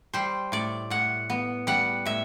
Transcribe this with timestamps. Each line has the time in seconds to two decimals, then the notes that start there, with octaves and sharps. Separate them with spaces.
0.14 G3 C5
0.52 A2 D5
0.90 A2 F#5
1.30 B3
1.67 G3 F#5
2.06 A2 E5